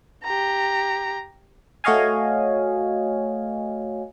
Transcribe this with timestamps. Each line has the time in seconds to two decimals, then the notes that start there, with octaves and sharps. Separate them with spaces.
0.24 G4 A#5
1.84 A3 F#4 C#5 D#5 F5 G#5